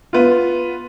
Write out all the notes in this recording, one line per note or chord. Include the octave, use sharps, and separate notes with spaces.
B3 F4